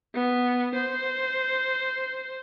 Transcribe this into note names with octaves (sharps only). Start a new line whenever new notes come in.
B3
C5